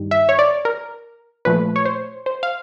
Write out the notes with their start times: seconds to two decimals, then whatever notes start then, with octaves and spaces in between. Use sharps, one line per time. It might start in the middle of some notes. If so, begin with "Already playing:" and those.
Already playing: G2 D#3 G3
0.11 E5
0.29 C#5
0.39 D5
0.65 A#4
1.45 A#2 F3 A3 B4
1.76 C#5
1.85 C5
2.26 C5
2.43 F5